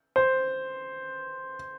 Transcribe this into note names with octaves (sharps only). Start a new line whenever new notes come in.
C5